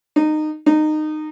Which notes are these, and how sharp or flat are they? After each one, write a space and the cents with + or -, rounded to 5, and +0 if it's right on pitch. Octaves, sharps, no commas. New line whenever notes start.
D#4 -20
D#4 -20